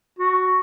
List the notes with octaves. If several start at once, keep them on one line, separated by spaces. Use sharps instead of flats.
F#4